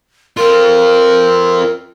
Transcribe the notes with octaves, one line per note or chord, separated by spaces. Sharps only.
C4 F4 A#4